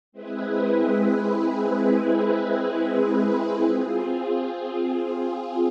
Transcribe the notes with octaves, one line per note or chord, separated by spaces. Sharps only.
G#3 C4 E4 G#4 B4
C4 F4 G#4